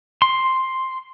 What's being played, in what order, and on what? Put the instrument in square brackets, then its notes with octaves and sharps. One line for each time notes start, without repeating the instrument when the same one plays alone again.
[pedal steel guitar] C6